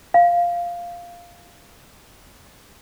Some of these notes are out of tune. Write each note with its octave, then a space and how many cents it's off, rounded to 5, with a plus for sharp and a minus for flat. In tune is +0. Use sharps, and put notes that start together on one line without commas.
F5 +0